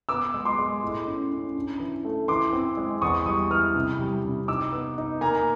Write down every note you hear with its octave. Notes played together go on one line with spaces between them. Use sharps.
B3 D6 E6
G#3
C6 D6
G#3
A2
C#4
C#4
D4
E3
A3
E3 C6 D6
C4
G#3
E2 C#6 D#6
G3 C#6 D#6
E3 D#6 F6
C3
G3
C3
D#4 D6 E6
B3
D#4
A#3 G#5 A#5